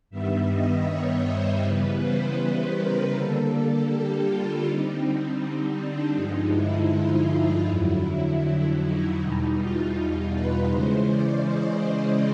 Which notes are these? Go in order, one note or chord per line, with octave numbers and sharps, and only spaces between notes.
G2 D#3 G3 B3 E5
D#5
C#5
C5
C#3 E3 G3 B3 B4
C5
A#4
D3 G3 A#3 A4
A4
G4
F4
D3 G3 C4 D#4
D4
G2 D3 F3 G#3 D#4
E4
F4
F2 D3 F#3 E4
D#4
E2 B2 G3 D#4
F4
B4
C#3 E3 G#3 C#4 C5
D5
D#5
D5